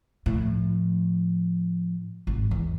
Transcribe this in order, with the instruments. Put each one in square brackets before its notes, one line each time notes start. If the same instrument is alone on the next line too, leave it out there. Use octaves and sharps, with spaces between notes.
[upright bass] A2 F3
G#1
E2